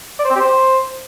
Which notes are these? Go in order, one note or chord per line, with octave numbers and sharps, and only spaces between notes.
D5
C5
C4
G4
C5